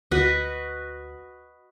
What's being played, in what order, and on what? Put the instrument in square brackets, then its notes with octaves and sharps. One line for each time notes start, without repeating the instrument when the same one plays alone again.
[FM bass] D2 [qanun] F#4 B4 D#5